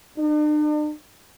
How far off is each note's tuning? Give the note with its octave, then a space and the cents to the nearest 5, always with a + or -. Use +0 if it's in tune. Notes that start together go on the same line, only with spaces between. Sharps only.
D4 +45